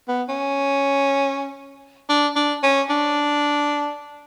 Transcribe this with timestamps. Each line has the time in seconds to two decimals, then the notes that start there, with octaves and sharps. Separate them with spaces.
0.08 B3
0.29 C#4
2.09 D4
2.36 D4
2.63 C#4
2.89 D4